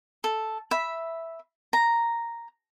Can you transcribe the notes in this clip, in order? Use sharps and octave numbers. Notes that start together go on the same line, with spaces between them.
A4
E5 B5
A#5